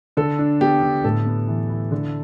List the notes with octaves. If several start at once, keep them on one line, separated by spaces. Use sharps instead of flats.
D3 A4
D4
B3 G4
D3
A2 A4
B3
E3
E4
D3